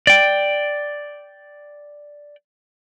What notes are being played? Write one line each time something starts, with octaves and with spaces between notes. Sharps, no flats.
D5 G5